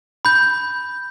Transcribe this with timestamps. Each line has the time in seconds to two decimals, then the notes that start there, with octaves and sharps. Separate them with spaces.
0.25 B5 G6